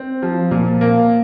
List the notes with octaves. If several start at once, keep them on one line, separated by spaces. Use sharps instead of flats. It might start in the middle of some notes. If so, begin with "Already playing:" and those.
Already playing: C4
F3
A#2
A#3